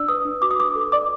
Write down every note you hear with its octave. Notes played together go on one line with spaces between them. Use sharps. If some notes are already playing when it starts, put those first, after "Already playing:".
Already playing: D4 D5 E6
B4 D#6
D4
F#4 D6
D#6
B4 D6
A4
D5 D6